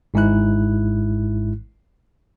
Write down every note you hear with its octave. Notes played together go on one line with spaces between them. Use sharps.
G#1 G#2 G#3 E4 F#6